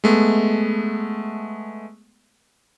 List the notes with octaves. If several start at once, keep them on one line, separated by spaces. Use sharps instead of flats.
G#3 A3 B3